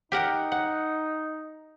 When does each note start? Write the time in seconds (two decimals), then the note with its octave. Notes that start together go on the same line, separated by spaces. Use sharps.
0.12 D#4 G4 A#4 F#5
0.52 F#5